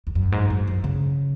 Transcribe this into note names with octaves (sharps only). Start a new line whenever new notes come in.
E2
F#2
G#2
F#2
F#2
C#3